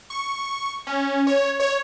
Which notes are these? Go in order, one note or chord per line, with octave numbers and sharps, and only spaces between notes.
C#6
C#4
C#5
C#5